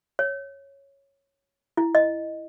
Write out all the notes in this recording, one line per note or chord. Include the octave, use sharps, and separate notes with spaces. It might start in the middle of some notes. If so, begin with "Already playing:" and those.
C#5
E4
D#5